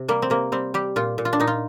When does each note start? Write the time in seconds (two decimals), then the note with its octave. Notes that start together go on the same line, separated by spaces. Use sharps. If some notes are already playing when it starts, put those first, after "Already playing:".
Already playing: C3
0.08 G3 A#3
0.22 C4
0.30 C3 A#3
0.52 G3 C4
0.74 G3 G4
0.96 A#2 F4
1.18 A#2
1.25 F4
1.33 D4
1.40 A#2 D#4
1.47 F4